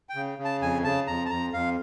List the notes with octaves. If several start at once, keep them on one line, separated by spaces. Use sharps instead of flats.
G5
C#3
C#3
A5
F2 G#5
C#3 A5
F2 A#5
A5
F2 A#5
F2 F5